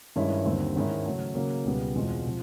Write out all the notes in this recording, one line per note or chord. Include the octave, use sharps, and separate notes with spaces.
G2 D#3 G#3 C#4 E4
D#2 D3 G3 C4
G#2 D#3 G#3 C#4 E4
C#3 F#3 A3
C#3 F#3 A#3
C#2 B2 G3 B3
E2 B2 G#3 C4 F4
C3 F3